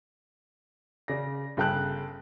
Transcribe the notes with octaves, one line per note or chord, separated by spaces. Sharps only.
C#3 D5 A#6
G1 C#3 G5 A5 F#6